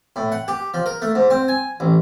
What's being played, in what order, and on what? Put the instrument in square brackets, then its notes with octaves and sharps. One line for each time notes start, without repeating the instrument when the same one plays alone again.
[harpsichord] A2
F#5
G4
F3
A#4
A3
G#2
C4
G#5
A1